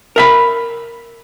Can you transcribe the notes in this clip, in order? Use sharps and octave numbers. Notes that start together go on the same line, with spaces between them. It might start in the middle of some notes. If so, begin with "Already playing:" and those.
A#4 E5 B5